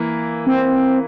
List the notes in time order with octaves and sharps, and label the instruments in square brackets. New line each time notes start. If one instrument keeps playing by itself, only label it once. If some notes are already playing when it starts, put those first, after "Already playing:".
Already playing: [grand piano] E3 A#3
[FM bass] C4